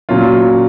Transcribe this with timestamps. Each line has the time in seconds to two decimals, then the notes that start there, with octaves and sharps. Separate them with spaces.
0.09 A#2 F#3 C#4 F4